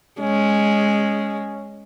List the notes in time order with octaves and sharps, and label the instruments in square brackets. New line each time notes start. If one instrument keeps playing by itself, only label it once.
[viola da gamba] G#3 [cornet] C#4